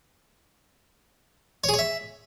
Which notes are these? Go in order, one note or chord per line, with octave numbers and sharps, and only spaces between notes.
C#5
G#4
C#5
E5